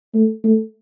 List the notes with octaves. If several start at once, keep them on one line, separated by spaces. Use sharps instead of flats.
A3
A3